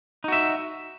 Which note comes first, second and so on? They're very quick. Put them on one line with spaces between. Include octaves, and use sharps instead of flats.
D#4 F#4 E5